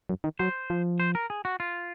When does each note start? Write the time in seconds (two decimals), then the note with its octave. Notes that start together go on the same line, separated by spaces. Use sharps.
0.09 F#2
0.24 D#3
0.39 F#3 C5
0.70 F3
1.00 C5
1.15 A#4
1.30 G#4
1.45 F#4
1.60 F4